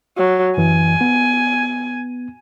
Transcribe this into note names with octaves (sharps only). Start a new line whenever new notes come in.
F#3
F#2 E3 G#5
B3